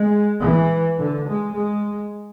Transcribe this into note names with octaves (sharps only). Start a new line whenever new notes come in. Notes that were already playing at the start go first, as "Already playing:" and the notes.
Already playing: G#3
E3
D3
G#3
G#3